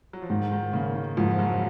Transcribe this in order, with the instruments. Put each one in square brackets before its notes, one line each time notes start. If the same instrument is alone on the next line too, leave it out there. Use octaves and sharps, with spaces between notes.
[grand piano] F#3
F3
[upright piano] G#2 [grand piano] D#3
[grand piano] D#3
[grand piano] C#3 [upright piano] A#3
[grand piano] D#3
[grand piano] F2 F3 [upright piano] G#2
[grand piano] F3
F#2 F#3